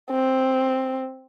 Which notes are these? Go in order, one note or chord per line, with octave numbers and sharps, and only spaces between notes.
C4